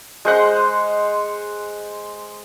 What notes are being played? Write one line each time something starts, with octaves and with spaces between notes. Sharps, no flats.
G#3 C5 F#5 C6